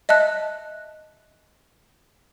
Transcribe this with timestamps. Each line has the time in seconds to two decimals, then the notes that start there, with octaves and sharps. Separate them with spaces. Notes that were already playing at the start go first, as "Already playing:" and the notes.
0.09 D#5 E5 A5 F#6